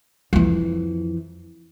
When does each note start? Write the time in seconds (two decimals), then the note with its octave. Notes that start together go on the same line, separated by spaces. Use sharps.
0.33 F2 E3